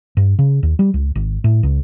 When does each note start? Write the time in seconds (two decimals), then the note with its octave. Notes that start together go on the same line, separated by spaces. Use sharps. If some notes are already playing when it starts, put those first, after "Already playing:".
0.17 G2
0.39 C#3
0.63 D#2
0.79 G3
0.94 C#2
1.15 G#1
1.44 A2
1.63 C#2